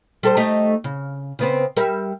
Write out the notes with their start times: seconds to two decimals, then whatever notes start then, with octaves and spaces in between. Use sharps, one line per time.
0.23 G3 A4 C5
0.36 A3 D#4 G4
0.84 C#3
1.39 C#3 B3 C4
1.77 G3 A#4 E5